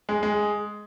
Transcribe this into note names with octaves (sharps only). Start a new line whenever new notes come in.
G#3
G#3